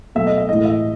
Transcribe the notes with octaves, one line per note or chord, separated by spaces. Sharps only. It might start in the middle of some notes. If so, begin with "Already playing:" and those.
B2 F#3 A3 E5
D#5
E5
A2 E3 G#3 D#5
E5